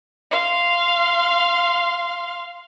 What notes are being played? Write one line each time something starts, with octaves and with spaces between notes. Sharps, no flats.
F5 C6